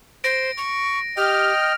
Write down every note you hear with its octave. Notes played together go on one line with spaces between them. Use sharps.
C5 A#6 D7
C#6
G4 D#5 G5 F6